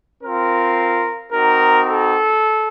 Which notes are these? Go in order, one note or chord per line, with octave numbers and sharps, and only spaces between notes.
C4 F4 A#4
C4 D#4 F#4 A#4
A4